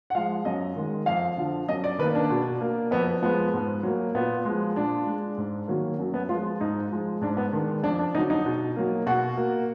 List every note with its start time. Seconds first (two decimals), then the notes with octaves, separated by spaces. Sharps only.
0.10 F#5
0.15 F3 G#3 F5
0.45 F#2 D#5
0.76 D#3 G#3
1.06 F2 F5
1.37 D3 F3
1.68 F#2 D#5
1.84 D5
1.99 D#3 B4
2.03 A#3
2.15 D4
2.30 B2
2.61 A#3
2.91 F2 B3
3.22 F3 G#3 B3
3.53 G#2
3.83 F#3 A#3
4.15 A#2 B3
4.45 F3 G#3
4.76 A#2 D4
5.07 G#3
5.38 G#2
5.68 D#3 F#3 A#3
5.99 F#2
6.14 B3
6.29 F3 G#3 F4
6.61 G#2 D#4
6.92 F3 G#3
7.21 G#2 D4
7.37 B3
7.53 D#3 G#3 D4
7.83 F2 D4
7.99 D4
8.14 D3 D#4
8.18 F#3
8.30 D#4
8.46 B2
8.76 F#3 A#3
9.06 B2 F#4
9.37 A#3